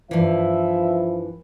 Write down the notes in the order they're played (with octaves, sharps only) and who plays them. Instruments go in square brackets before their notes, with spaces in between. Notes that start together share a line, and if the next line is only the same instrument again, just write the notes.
[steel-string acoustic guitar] G2 E3 [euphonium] F3 [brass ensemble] E4 E5